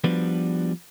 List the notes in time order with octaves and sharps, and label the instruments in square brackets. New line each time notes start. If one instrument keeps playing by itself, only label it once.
[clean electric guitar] F3 G3 B3 D4 F#4 B4